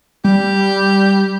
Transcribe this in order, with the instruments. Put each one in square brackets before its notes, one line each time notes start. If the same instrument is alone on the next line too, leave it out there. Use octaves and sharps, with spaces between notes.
[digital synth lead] G3 [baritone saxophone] G4